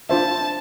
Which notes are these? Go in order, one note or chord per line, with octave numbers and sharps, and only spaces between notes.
D4 F4 C5 E5 A5